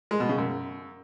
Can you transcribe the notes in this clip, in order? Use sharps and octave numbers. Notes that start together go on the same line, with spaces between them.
G#3
B2
C#3
F#2